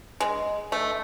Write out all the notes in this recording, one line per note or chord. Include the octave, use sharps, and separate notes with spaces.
G#3
A3